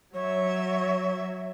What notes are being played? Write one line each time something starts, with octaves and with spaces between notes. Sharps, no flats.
F#3 C#5 E5